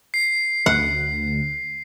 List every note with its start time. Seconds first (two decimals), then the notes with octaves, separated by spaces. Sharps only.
0.14 C7
0.66 D2 F#5